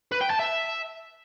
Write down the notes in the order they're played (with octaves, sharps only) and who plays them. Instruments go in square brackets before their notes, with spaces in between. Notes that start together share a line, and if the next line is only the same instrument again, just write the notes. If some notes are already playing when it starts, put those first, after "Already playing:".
[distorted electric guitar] B4
G5
A5
E5